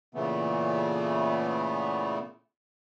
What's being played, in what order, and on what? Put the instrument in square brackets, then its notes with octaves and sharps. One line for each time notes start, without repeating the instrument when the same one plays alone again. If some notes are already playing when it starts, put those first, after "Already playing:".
[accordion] A#2 C#3 E3 A3 B3